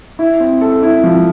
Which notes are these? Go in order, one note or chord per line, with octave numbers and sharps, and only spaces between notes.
E4
C4
A4
E4
F3